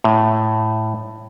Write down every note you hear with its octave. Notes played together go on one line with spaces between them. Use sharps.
A2